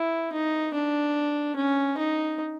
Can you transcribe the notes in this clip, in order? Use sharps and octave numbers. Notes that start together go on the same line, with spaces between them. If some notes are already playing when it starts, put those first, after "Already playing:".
Already playing: E4
D#4
D4
C#4
D#4